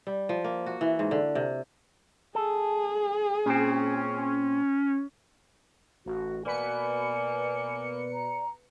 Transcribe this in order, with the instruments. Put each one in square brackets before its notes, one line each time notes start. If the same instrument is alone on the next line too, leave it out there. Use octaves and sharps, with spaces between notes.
[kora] G3
F3
A#3
F#4
E3
G#2
D3
C3
[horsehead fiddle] G#4 [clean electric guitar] A4
[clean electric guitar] A#2 C4 [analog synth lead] C#4
[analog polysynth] A1 [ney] F#4
[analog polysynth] B2 B4 C#7 [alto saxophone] A#3 [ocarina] D5 [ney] G#5
[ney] A#5